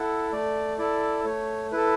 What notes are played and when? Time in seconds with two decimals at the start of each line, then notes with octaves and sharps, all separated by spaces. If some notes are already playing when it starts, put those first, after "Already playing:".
Already playing: E4 A4 F#5
0.32 A3 D5
0.78 E4 A4 D5
1.25 A3 C#5
1.72 E4 A4 B4